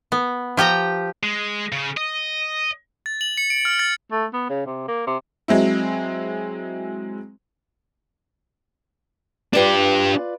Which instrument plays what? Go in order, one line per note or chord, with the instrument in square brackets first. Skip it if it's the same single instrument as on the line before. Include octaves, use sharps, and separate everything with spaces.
[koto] B3
F3 G4 G5 A#5
[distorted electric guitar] G#3
C#3
D#5
[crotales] A6
F#7
C#7
D7
F6
A6
[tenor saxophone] A3
B3
C#3
C3
A#3
C3
[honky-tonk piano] F#3 G#3 C4 E4
[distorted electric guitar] D4 G4 [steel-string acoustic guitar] F4 B4 D5